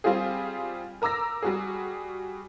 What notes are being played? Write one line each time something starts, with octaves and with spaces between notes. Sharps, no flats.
G3 C4 F4 G4 G#4
A#4 A#5 D6 E6 A#6
G3 F#4 G#4